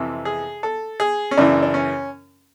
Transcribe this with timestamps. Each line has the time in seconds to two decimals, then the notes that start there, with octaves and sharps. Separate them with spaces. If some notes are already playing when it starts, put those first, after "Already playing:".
Already playing: F2 C3 E3
0.25 G#4
0.63 A4
1.00 G#4
1.31 C#4
1.37 F#2 C#3 E3 D4
1.63 D4
1.74 C#4